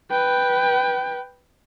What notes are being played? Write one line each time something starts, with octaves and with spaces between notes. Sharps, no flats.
B4 G5